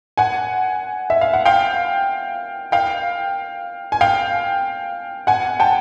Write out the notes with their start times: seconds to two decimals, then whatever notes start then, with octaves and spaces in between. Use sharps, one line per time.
0.17 F#5 G#5
1.10 E5
1.21 F5
1.33 F#5
1.46 F5 G5
2.72 F5 G5
3.92 G#5
4.01 F5 G5
5.27 F#5 G#5
5.60 G5 A5